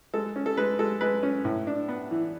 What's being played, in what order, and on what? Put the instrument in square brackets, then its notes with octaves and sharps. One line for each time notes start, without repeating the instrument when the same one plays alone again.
[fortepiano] G#3 A4
C#4
A4
G#3 B4
G#3 A4
G#3 B4
C#4
A2
D4
B3
E3